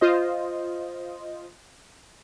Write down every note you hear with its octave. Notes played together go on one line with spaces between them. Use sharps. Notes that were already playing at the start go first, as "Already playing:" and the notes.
F4 C5 D#5